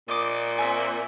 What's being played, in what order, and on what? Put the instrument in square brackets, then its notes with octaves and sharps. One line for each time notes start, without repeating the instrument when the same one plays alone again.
[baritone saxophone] A#2 [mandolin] D#5 D6
[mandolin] C4 E5 G#5